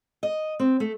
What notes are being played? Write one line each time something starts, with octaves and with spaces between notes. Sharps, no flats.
D#5
C4
A3